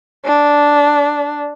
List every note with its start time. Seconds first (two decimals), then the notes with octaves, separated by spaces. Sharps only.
0.25 D4